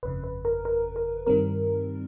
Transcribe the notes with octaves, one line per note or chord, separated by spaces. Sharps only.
G1 F2 C#3 B4
B4
A#4
A#4
A#4
G2 D#3 G3 C4 A#4